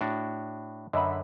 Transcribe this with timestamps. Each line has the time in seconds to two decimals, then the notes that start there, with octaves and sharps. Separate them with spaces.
0.01 A2 D4 F#4
0.93 F#2 D3 D#5 E5 B5